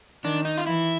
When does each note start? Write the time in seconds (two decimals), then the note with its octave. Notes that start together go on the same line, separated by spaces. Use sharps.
0.24 D#3 D4
0.45 D#4
0.57 F4
0.66 E3 E4